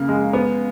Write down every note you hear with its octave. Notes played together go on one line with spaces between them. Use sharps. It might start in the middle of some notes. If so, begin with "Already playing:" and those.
Already playing: C#3 A#3
G#3
B3